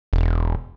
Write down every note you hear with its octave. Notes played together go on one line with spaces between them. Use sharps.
E1